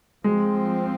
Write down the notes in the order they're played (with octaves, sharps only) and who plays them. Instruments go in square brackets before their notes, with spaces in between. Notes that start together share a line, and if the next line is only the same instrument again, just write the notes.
[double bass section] F3 C4 [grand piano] G#3